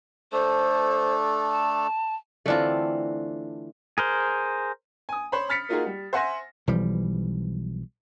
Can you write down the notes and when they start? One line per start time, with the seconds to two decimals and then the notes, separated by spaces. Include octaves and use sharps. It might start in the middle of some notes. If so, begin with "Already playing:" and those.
0.32 A3 D4 A4 C5
1.51 A5
2.46 D3 E3 A3 C4 D4 F4
3.98 G#4 A#4 C5
5.09 G#5 D#6
5.32 C5 C#5 B5
5.49 B5 F6 A6 B6 C#7
5.69 A#3 D#4 F4 F#4 G#4 A#4
5.86 G3
6.13 C5 E5 F#5 G#5 C6 A#6
6.67 B1 E3 F3 G3